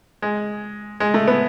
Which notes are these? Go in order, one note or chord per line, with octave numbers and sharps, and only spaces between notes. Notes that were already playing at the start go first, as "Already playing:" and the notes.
G#3
G#3
A3
B3